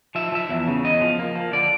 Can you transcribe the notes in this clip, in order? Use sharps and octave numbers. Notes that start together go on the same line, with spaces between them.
F3 E5
F3 E5
E2
C#3
E2 D#5
F3
A#3
F3
D3 D5